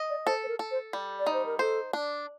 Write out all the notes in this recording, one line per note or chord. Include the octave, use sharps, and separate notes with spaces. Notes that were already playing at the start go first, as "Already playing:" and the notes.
Already playing: D#5
D5
A4 C5
C5
A#4
A4
C5
G3
D5
D#4
C5
A#4
A4 C5
D4